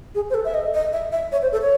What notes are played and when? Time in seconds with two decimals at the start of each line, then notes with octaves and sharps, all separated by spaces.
0.15 G#4
0.30 C5
0.34 A4
0.45 E5
0.54 D#5
0.74 D#5
0.93 E5
1.12 E5
1.32 C#5
1.42 C5
1.52 A4
1.61 C#5